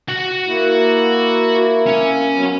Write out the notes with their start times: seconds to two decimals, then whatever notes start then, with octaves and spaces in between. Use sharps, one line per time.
0.09 F#4 F#5
0.46 A#3 E4
1.87 C#4
2.34 F#3 B3